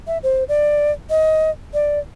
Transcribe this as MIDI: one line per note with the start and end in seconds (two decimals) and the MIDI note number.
0.07 0.18 76
0.23 0.44 72
0.49 0.92 74
1.10 1.50 75
1.74 1.99 74